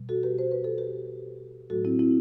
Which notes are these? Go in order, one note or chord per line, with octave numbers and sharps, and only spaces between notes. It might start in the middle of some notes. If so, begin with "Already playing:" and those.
Already playing: B2 G3
F#4 A4
G4 B4
C5
B4
A4
G4 B4
A2 F#3 A3 F#4 A4
C4 E4
C4 E4